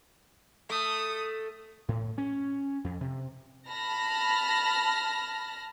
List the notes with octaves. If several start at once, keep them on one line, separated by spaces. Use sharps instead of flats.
A3 D#6
A2
C#4
F2
C3
A5 B5 F6 A#6